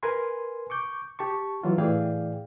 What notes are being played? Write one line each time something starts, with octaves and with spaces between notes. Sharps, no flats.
A#4 B4 G#5 C6
C#6 D6 G6
G4 A5 C#6
E3 F#3 F4
A2 E3 G#4 D5 F5 G5